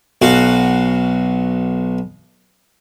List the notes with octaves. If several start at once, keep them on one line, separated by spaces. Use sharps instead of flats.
B1 F#4 F5